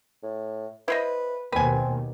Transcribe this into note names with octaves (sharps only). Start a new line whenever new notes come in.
A2
E4 B4 C5 D#5
D#2 B2 C4 B4 G#5